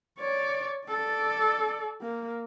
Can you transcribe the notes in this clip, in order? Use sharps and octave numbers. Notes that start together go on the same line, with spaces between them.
C#5 D5
A4 D5
A#3